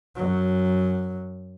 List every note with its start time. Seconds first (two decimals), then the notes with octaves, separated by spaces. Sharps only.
0.15 F#2 F#3